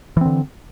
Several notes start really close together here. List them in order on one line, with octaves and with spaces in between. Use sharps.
E3 C4 D3